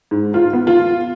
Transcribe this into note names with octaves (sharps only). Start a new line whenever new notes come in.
G#2
F4
B3
F4